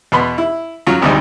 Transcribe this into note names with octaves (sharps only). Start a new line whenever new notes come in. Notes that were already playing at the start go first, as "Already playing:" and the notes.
E2 B2 B3 B5 C6
E4
F#2 F#3 F4 F#4 A#5 C#6
G#1 D2 C3 G3 D#4 G#5